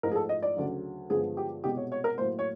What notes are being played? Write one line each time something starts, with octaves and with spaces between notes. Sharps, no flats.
G#2 F3 A3 A#4
G#4
A4
D#5
D5
D2 C#3 F#3
G2 D3 F3 G#3 B3 G#4
G4
C2 B2 G#3 G4
C#5
C#5
A#4
A2 F#3 A#3 C5
C#5